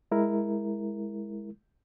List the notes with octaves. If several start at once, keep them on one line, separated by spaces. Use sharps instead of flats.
G#3 E4 A#4